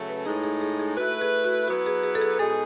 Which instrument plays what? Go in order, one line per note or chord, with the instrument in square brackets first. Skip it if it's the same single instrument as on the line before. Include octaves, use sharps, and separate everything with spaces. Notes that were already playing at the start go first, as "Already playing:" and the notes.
Already playing: [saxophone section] C#3 F#3 A3
[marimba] B4
[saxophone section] A2 G#3 D#4 [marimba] G#4
[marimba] G#4
G#4
G#4
[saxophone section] A3 E4 B4 [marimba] F#4
[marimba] G#4
F#4
[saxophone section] F#3 B3 E4 B4 [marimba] F#4
[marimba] G#4
G#4
A4
G#4
[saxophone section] B2 G#3 D#4 G#4 [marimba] A4